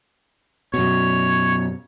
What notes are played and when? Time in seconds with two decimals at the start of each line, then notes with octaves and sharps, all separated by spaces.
0.74 F#2 B2 C#5